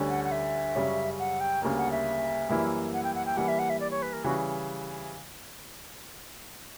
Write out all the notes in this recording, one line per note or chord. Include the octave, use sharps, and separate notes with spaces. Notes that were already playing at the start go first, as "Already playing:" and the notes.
Already playing: D2 D3 G3 C#4
F#5
F#5
E5
F#2 C#3 G3 C#4
F#5
G5
D2 C#3 G3 A#3
F#5
E5
F#2 E3 G3 A#3 E4
F#5
G5
F#5
G5
E3 G3 A#3 F#5
E5
F#5
E5
D5
C#5
B4
A#4
C#3 E3 G3 F#4